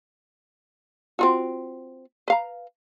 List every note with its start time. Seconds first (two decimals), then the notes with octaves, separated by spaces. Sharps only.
1.19 C4 F4 F#4
2.28 B4 F5 A#5